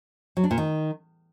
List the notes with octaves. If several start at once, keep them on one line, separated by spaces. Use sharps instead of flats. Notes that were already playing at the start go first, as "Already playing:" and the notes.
F#3
D4
A#2
D#3